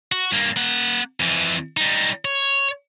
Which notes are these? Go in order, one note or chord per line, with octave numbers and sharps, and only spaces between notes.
F#4
G2 A#3
A#3 F#5
F2 E3
G3 D#4
C#5